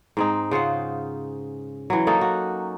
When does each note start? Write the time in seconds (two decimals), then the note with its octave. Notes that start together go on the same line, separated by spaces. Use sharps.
0.17 G#2 C4 D#4
0.51 C#3 F4 C5 F#5
1.90 E3 F#3
2.07 A#3 C#4 D#4 A4
2.21 F#4